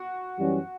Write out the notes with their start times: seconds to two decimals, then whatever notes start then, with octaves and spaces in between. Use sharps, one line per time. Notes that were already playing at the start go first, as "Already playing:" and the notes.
Already playing: F#4
0.38 F#2 E3 G3 C#4 G4